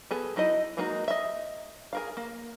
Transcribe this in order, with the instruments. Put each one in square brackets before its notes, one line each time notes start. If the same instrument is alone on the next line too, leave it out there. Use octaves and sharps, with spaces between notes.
[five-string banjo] B3 G#4 A4
F#3 D#4 E4 D#5
F#3 G#3 A#3 D#4 F#4
D#5 E5
G#4 A#4 F5
A#3